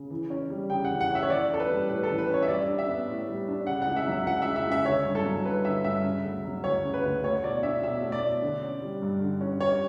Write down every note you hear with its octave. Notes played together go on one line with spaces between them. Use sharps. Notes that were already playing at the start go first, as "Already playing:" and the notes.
Already playing: C#3
E3
C#4
G3
C#3 G5
F#5
E3
F#5
C#4 E5
C#5
E3 D5
C#4 A4
B4
G3
A2 B4
A4
E3
B4
C#4 C#5
E5
G3 D5
D4
E5
B3
A2
G3
D4
C#3 F#5
F#5
C#2
E5
F#3 E5
C#2 F#5
E5
C#3
E5
C#2
E5
D3 C#5
G2
A4
F#3
G2 B4
D3 E5
G2 E5
C#3
D2
F#3
D2 C#5
C#3
B4
D2
A3 C#5
B2 D5
D4 E5
B2 E5
A3
D5
B2
D3
C#4
G3
G2
D3
C#4
G3 C#5